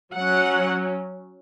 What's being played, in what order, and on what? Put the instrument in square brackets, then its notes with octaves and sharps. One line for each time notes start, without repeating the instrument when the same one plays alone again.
[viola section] F#3 C#4 F#5